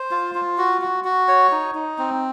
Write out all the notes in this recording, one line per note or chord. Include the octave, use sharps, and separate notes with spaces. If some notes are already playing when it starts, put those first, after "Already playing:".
Already playing: C5
F4
F4
F#4
F#4
F#4
C#5
D#4
D#4
C4